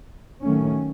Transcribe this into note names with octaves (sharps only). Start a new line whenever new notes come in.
D#3 F#3 A3 C#4